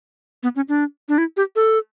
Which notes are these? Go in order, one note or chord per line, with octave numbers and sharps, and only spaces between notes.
B3
C#4
D4
D4
E4
G4
A4